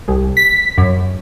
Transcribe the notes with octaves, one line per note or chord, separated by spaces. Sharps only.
C2
B6
F#2